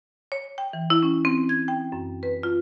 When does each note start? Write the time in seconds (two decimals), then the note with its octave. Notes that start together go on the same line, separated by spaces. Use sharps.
0.32 C#5
0.58 G5
0.73 E3
0.90 E4
1.03 C#4
1.25 C4
1.49 G#6
1.68 G5
1.92 F#2
2.23 B4
2.43 F4